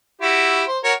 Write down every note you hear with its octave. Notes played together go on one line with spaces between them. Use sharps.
E4 F#4 G4
C5
F#4 A#4 C#5